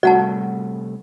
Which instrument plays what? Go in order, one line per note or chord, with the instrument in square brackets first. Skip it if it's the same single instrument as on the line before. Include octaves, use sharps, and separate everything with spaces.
[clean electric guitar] C3 G3 A3 [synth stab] F#4 [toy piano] D5 F#5 A5